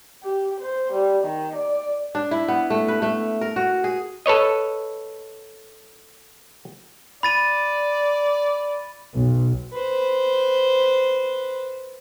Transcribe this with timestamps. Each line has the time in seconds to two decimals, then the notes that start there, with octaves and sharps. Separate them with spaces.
0.24 G4
0.61 C5
0.93 G3
1.25 D#3
1.56 D5
2.15 D4
2.31 E4
2.48 B3
2.70 A3
2.88 B4
3.02 A3
3.41 A#4
3.56 F#4
3.84 G#4
4.26 A4 B4 C#5 D#5
7.23 D5 B5 A6 D#7
9.14 B1
9.73 B4 C5